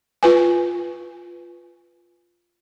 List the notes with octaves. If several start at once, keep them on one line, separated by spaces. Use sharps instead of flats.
F4 B4 G#5